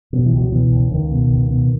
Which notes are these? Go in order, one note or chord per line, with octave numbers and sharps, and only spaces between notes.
B2 F#3
E3
C#2 F#3
B2 E3
C#2
C#2 D#3
B2
C#2
B2